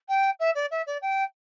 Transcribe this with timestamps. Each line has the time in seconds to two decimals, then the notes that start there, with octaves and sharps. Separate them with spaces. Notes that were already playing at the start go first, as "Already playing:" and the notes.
0.09 G5
0.40 E5
0.55 D5
0.71 E5
0.87 D5
1.02 G5